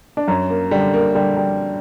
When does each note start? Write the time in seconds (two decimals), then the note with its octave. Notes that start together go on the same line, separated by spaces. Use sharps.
0.17 D4
0.28 F#2 C#4
0.50 A#3
0.71 D3 G3
0.94 A#3
1.15 D3 G3
1.37 G3